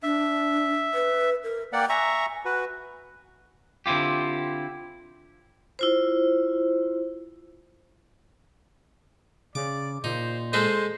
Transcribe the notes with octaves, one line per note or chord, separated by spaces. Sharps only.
D4 E5
B4
A#4
A#3 D5 F#5 G5
E5 G#5 A#5 C#6
F#4 B4
D3 C4 E4 F4 G4
E4 F4 C5
C#3 D5 D6
A#2 D#4 C5
G#3 A4 C5 D#5